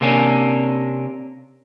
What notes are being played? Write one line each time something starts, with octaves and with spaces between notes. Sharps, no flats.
C3 A#3 C#4 D4